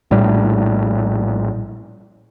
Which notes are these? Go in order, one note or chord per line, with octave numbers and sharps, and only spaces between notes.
A#1 A2 G3